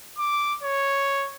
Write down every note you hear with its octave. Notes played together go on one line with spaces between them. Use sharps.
D6
C#5